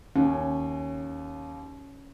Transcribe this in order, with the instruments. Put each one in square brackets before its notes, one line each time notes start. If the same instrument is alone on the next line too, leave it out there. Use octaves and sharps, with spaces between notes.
[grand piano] D#2 [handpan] C#4